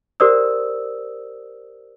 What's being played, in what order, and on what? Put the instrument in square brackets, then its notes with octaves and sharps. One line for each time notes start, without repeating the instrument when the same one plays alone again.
[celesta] G4 A#4 C5 D5 D#6 E6